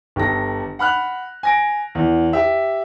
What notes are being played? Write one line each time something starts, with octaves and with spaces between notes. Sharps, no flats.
G1 G4 A4 A#6
F#5 B5 F6 F#6
G#5 A#6 D7
E2
G4 E5